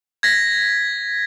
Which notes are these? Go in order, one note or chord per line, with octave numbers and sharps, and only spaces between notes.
G#6 A#6 B6